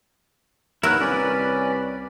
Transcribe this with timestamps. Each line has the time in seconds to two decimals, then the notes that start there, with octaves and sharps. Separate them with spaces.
0.83 D#2 E4 A#4 B4 C#5 F#5 E6 F#6
1.00 C2 C#4 B4 D5 B5